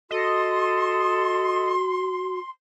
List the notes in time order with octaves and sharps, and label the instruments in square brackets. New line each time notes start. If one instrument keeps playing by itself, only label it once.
[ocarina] F#4 [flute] A4 [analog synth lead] D#5 [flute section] C6